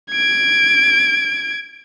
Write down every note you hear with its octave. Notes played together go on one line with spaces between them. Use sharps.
G#6 D7